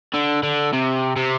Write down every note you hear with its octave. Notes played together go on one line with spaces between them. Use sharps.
D3
D3
C3
C3